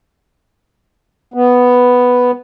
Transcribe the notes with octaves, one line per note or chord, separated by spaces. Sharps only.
B3